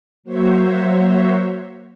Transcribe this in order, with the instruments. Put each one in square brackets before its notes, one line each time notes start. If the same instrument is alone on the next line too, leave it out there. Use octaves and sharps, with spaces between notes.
[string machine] F#3 A#3 F#4 C5 C#5 E5